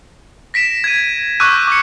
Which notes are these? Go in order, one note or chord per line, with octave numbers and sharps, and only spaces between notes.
A#6 B6 D7 E7
G#6 D#7
C#6 D6 E6 F#6 G6 D#7
D6 C#7